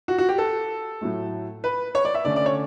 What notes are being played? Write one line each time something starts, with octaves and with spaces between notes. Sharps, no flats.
F#4
F#4
G4
A4
A2 F#3 A3
B4
C#5
D5
E5
D3 A3 C#4 D5
D5
C#5